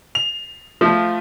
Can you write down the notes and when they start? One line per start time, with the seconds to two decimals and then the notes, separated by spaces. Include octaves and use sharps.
0.15 F7
0.81 F3 A3 F4